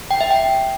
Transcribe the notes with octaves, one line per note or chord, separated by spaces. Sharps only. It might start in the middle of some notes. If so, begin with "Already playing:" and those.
G5
E5
G5